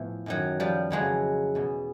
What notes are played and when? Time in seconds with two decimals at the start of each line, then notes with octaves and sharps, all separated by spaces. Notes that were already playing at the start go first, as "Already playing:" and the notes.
Already playing: A2 E3 F3 B3
0.26 F#2 D#3 F#3
0.60 F3 G3
0.91 F2 C#3 E3 F#3 G#3
1.55 E2 B2